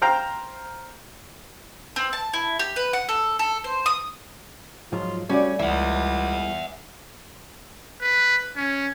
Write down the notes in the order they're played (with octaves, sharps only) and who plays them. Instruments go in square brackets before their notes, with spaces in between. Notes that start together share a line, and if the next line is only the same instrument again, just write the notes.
[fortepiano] C5 F5 G5 A#5
[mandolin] C4
A5
E4
G4
B4
F#5
A4
A4
C5
D#6
[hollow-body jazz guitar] G#2 F3 F#3 [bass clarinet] F4
[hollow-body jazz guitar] G3 A3 D5 [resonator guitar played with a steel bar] C#4 [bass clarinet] F#4
[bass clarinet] C#2 [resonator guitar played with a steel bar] E3 [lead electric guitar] E5 F#5
[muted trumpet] B4
C#4